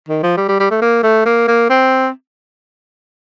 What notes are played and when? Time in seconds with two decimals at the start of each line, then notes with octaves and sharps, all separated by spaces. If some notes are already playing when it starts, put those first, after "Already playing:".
0.08 D#3
0.23 F3
0.37 G3
0.48 G3
0.60 G3
0.71 A3
0.82 A#3
1.03 A3
1.25 A#3
1.48 A#3
1.70 C4